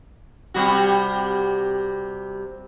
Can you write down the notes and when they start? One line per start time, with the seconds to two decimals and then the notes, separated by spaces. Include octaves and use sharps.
0.54 C3 G3 F#4